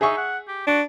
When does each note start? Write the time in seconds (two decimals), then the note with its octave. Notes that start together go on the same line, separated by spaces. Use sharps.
0.01 D#4 G#4 E5 C#6
0.17 F#5
0.48 G4
0.67 D4 F#4